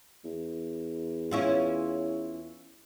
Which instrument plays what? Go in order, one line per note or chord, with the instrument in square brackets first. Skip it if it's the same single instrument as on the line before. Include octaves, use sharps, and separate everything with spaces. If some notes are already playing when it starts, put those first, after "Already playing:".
[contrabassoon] E2
[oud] C#4 E4 F4